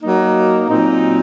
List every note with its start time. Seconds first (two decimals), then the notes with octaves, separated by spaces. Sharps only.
0.02 F#3 A#3 D#4
0.68 A#2 F#3 C4 D#4